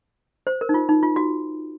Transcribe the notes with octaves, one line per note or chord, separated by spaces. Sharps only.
C5
A#4
D#4
F4
D#4
F4
F#4